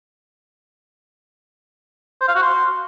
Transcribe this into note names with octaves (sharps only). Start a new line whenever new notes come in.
C5
F5
F#4
C6